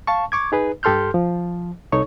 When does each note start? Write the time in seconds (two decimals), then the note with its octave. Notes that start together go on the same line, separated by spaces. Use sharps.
0.07 F5 A5 C#6
0.32 C#6 D6 G#6
0.52 D#4 G#4 B4
0.83 G2 G4 A4 C6 F6 G6
1.14 F3
1.92 C2 D#4 A4 C#5 C#6